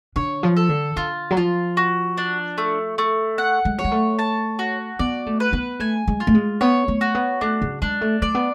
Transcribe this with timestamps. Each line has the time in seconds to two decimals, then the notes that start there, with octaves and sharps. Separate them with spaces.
0.16 D3 C#5
0.43 F3
0.57 A4
0.69 D3
0.96 D3 F4
1.31 F#3
1.37 F3 F4
1.77 F#4
2.17 D4
2.58 A3
2.98 A3
3.38 F#5
3.65 G#3
3.78 F#3 C#5
3.84 G#3
3.92 A3
4.19 A5
4.59 F#4
4.99 B3 D5
5.26 A3
5.40 B4
5.53 B3
5.80 A3 G#5
6.07 G#3
6.20 F4
6.27 A3
6.34 G#3
6.61 B3 C#5
6.88 A3
7.01 F#4
7.15 B3
7.41 A3 D4
7.62 C#3
7.82 G#3 D4
8.01 A3
8.22 A3 D5
8.35 B3